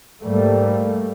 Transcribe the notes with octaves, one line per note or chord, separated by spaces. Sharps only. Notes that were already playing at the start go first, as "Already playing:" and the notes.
G#2 G3 A3 A#3